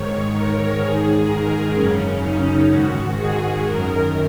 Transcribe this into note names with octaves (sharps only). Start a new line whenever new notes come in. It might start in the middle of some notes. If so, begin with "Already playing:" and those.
Already playing: G#2 D#3 C#5
A#4
G#2 D#3 G#4
A#4
F#2 C#3 C#4
D#4
G#2 D#3 F#4
G#4
F#2 D#3 A#4